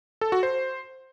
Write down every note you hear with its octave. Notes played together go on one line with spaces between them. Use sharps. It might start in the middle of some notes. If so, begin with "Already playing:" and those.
A4
F#4
C5